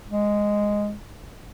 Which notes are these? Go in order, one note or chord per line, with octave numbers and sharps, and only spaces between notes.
G#3